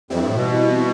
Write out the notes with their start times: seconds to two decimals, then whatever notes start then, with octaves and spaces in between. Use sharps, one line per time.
0.10 F2 E3 G3 C4 E4
0.19 G2
0.27 A2
0.35 B2